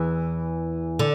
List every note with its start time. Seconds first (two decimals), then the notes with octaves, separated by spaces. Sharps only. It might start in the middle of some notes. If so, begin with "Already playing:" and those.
Already playing: E2 E3
0.99 D3